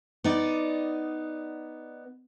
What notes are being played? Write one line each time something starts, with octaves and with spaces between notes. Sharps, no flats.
B3 D#4 D5